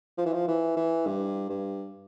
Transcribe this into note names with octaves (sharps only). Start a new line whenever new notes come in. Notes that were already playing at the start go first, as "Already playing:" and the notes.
F3
E3
F3
E3
E3
G2
G2